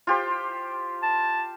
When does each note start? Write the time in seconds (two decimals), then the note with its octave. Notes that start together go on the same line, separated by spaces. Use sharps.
0.07 F4 G4 C5
1.02 A5